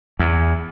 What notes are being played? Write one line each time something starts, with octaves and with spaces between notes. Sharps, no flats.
E2